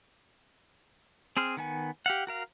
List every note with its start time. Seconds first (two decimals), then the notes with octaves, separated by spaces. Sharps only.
1.37 C4 G#4 C6 F6
1.57 D#3 B3 G#5
2.06 G4 F5 F#5
2.27 F#4 A#4 F5